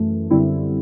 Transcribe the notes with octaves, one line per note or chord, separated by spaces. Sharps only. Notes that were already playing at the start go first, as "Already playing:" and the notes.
Already playing: F#2 E3 A3
F#2 D3 G3 C4 E4